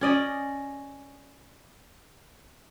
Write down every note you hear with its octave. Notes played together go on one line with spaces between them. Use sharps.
C#4 D5 D#5